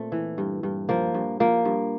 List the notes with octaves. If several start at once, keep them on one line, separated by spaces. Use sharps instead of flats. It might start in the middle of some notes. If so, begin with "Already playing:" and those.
Already playing: A#2 A3 C4
E3
G2
G2
F3 A#3
G2
F3 A#3
G2